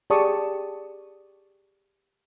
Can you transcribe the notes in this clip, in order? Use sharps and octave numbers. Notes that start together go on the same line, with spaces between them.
G4 G#4 D5 A5 C#6 D#6